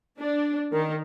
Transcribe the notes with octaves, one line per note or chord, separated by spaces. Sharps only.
D4
D#3